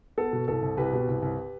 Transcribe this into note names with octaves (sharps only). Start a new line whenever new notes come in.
B3 A4
B2
C2 A4
C2
C2 G4 B4
B2
C2
C2